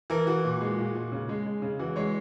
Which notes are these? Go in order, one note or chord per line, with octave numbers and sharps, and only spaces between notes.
E3 A#4
E3 F#4
A#2
G#3
A#2
A#2
C#3
G#3
G#3
C#3
E3 F#4
G#3 C#5